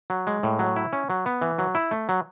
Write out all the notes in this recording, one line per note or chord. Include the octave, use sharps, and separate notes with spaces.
F#3
G#3
A2
F#3
E4
C#4
F#3
B3
E3
F#3
E4
A3
F#3